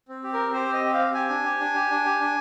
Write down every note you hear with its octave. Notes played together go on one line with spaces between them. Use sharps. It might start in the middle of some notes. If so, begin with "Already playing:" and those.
C4
G4
A#4
C4
G4 C5
C4 D#5
G4
F5
C4
G4 G#5
D4
G4
D4
G4
D4
G4
D4